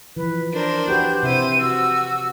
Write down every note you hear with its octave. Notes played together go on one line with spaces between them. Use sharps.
E3 F3 B4
D4 A#4 C5
F#4 G4 B4 G6
C3 E4 C5 D#7
F#4 E6